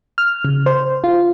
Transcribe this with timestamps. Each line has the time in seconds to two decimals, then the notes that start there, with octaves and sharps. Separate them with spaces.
0.18 F6
0.45 C#3
0.66 C5
1.04 F4